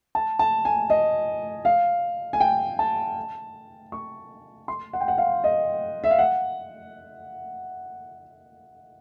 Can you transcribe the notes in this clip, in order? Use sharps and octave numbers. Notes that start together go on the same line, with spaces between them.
A5
A5
G#5
D#5
F5
G#5
G5
A5
C#6
C6
F#5
G5
F#5
F5
D#5
E5
F5
F#5